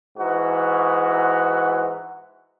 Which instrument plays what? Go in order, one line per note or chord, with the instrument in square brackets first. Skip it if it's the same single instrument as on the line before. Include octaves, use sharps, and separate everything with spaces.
[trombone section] G#2 E3 F#4